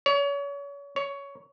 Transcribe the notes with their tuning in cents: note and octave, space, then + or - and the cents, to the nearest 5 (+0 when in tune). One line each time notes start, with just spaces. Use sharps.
C#5 +35
C#5 +15